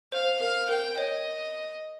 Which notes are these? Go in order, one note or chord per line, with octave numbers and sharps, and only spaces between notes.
C5 F5
A#4 F5
A#4 G5
C#5 D#5